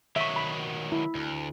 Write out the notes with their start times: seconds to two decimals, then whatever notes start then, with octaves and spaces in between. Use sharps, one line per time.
0.16 D#3 F#3 E5 C#6
0.36 B5
0.92 E4
1.15 D2